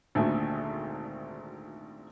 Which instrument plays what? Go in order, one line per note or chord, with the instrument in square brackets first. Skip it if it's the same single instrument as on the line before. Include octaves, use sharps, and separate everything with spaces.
[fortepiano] G#1 D2 A#2 A3 A4 G#5